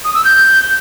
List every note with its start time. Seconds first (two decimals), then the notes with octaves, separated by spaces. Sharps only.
0.04 D#6
0.15 E6
0.25 G6